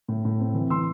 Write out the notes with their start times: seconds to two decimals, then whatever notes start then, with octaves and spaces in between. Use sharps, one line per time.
0.08 A2
0.25 A2
0.40 C4
0.55 E3
0.70 E3 C6 E6